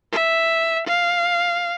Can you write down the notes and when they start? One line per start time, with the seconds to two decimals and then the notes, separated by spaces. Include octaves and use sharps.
0.12 E5
0.87 F5